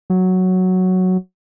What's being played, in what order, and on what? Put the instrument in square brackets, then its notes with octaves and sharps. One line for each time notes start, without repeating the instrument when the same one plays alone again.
[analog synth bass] F#3